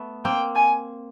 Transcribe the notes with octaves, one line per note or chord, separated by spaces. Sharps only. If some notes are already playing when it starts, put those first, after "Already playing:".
Already playing: A3 B3
A#3 C4 G5
G#5